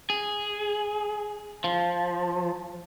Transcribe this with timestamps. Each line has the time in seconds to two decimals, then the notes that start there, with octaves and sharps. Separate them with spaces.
0.10 G#4
1.64 F3